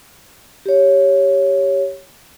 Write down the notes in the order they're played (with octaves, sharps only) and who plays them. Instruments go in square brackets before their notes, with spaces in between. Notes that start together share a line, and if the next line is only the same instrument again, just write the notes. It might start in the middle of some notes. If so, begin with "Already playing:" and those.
[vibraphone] G4 C#5